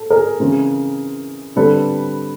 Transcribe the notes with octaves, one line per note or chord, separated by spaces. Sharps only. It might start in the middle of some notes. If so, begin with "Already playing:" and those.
Already playing: A4
G#4 A#4
C#3 E3 G#3 C4
D3 G3 C4 A4 B4